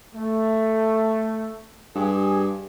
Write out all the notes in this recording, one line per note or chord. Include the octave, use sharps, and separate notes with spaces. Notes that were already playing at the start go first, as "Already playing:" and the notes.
A3
G2 G4 G#4